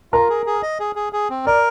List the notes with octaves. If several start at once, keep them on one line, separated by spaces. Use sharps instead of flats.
F4 A#4 A#5
G#4
G#4
D#5
G#4
G#4
G#4
C4
A#4 D5